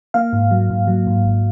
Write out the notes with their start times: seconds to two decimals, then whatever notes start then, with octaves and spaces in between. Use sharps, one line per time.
0.14 A#3 F5
0.33 G#2
0.51 F#3
0.70 G#2
0.87 F#3
1.07 G#2
1.25 G#1